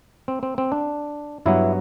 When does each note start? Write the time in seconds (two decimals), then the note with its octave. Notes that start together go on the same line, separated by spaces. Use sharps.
0.28 C4
0.43 C4
0.58 C4
0.72 D4
1.46 G2 F#3 B3 E4